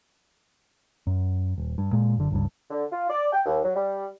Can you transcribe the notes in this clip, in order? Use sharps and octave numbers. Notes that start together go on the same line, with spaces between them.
F#2
D#1
G2
A#2 G#3
F#1 D3
G1 C#2 G2
D3
F4
D5
G5
D#2
F#3
G3